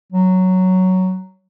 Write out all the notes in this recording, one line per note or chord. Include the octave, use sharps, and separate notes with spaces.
F#3